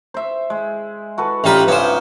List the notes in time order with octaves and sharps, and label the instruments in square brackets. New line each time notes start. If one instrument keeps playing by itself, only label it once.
[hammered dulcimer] C5 E5
G#3
F#4 A4 B4
[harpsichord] A1 G3 B4 [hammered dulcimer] D#4 F4 E5
[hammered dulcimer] G2 C#4 G#5 [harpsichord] B3 C5